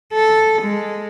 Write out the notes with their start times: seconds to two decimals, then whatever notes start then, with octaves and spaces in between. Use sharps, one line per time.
0.13 A4
0.62 G#3